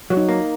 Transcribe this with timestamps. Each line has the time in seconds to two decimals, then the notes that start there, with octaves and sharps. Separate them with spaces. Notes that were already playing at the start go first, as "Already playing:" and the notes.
0.10 F#3
0.17 D#4
0.29 A#3